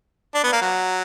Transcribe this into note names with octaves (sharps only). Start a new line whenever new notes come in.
D4
B3
A#3
F#3